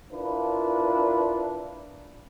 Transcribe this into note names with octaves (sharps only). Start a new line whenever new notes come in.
D4 E4 F4 A#4 B4